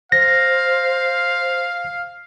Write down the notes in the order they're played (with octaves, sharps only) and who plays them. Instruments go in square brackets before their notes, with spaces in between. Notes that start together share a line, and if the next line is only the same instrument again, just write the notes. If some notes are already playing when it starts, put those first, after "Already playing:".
[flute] C5 [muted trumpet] F5 [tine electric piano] A#6